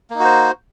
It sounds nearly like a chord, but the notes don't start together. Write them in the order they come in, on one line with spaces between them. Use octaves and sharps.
A#3 D#4 F#4 C5